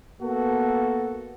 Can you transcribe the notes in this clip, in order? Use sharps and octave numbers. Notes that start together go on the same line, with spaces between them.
A#3 B3 F#4 A4